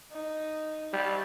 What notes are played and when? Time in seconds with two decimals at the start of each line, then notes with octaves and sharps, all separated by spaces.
0.12 D#4
0.93 G3 A5